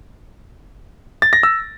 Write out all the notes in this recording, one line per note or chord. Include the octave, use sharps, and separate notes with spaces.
A6
A#6
E6